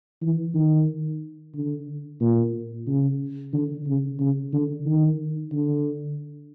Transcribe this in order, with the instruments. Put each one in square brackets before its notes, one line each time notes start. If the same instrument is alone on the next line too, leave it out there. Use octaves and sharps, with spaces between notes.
[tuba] E3
D#3
D3
A#2
C#3
D3
C#3
C#3
D3
D#3
D3